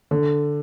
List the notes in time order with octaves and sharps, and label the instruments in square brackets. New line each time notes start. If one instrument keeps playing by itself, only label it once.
[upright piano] D3